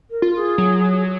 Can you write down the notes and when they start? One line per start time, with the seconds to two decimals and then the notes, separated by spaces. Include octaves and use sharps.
0.10 A#4
0.22 F4
0.35 G#4
0.58 F#3